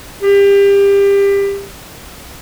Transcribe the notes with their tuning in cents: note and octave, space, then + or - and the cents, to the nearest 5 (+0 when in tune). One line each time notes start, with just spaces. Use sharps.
G4 +25